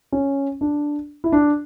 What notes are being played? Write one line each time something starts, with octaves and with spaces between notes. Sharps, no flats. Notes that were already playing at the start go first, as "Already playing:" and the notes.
C#4
D4
E4
D4